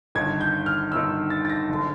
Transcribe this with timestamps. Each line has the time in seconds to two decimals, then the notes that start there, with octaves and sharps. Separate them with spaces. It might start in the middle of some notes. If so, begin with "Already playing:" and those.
0.15 G1 G2 D#3 G#6
0.41 G6
0.66 F6
0.92 G1 G2 D#3 E6
1.30 A6
1.45 A6
1.50 A#6
1.69 F#1 D3